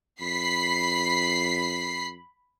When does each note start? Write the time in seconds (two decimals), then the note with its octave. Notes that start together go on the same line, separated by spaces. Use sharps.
0.21 F2 B5 B6 C7